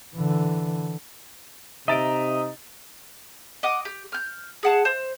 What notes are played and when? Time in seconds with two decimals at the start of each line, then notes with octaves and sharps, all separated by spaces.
0.15 D3 E3
1.88 C3 D#4 D#5 E5 A#5 A6 D7
3.63 D#5 F#5 D6
3.85 G4
4.12 F6 G6
4.63 G#4 F#5 A5
4.85 C5